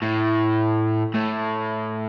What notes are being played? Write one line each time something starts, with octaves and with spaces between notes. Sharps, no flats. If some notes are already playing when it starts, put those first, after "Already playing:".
A2
A2